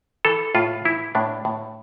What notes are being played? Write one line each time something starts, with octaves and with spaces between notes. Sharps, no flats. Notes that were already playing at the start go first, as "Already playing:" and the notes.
E3 A4
A2 F4
E3 E4
A2 D4
A2